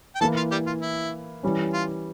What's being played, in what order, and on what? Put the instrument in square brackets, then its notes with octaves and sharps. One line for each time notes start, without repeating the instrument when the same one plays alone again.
[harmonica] G5
[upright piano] E3 A#3 E4 A#4 [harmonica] A4 A5
[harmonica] F4 F5
G3 G4
F4
E4
[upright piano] E3 G3 C#4
[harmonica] F4